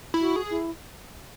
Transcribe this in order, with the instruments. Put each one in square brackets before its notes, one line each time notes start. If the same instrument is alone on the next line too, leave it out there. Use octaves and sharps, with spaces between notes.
[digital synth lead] E4
[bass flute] F#4
[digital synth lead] G#4
[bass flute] E4